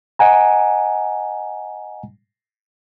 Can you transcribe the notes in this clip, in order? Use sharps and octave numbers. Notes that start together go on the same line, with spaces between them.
D#5 F#5 G#5 A#5